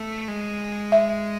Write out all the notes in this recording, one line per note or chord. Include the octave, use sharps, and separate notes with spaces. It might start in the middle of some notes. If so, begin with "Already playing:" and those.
Already playing: A3
G#3
E5